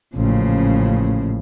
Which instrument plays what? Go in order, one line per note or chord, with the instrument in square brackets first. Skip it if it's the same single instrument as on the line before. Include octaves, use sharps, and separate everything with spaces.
[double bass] A1 [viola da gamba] A#2 C#3 F3